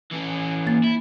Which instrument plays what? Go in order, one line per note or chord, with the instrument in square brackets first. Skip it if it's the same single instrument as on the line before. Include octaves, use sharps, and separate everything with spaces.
[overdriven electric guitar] E3 C#4
[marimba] A#3 A6
[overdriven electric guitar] E4